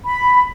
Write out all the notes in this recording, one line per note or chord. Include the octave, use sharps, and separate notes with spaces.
B5